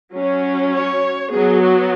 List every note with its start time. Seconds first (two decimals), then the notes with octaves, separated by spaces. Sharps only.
0.14 F#3 C#4
0.73 C#5
1.31 F#3 B3 G#4
1.61 F#4